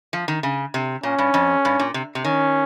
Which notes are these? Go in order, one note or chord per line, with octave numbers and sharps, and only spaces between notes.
F3
D#3
C#3
C3
A#2 C#4
G2
F2
G2
A#2
C3
C3
D#3 C#4